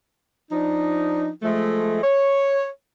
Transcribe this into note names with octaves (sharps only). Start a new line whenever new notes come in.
F3 D4 D#4
F3 G#3 A3
C#5